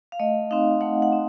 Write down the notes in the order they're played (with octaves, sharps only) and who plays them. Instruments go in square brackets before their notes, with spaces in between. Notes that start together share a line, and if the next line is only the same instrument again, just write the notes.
[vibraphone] F5
A3 D#5
C4 D#4 F5
A3 F#5
F#5
C4 D#4